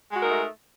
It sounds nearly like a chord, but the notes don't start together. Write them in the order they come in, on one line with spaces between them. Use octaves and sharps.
G#3 F#4 A#4 D#4 A3